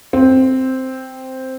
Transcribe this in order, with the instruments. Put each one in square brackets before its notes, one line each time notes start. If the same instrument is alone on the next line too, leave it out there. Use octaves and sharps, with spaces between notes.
[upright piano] C4